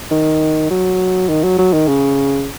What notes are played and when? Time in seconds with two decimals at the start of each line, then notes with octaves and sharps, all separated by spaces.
0.11 D#3
0.70 F#3
1.29 D#3
1.43 F#3
1.58 F#3
1.73 D#3
1.88 C#3